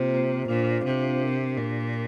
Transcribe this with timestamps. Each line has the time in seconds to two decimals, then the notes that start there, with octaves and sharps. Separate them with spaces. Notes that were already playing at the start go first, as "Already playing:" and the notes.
Already playing: C3 A#3 F4 C5
0.11 A#3 F4 C5
0.48 A#2 D4 F4 C5 F5
0.84 C3 D4 F4 C5 F5
1.21 D4 G4 A#4
1.58 A#2 D4 G4 A#4